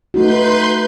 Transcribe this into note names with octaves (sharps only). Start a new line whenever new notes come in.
A3 D#4 F#4 B4 C6 G6